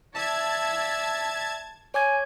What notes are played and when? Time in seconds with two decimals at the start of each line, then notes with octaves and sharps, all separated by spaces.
0.15 D5 E5 A5 G#6
1.94 C#5 G#5 D6 G#6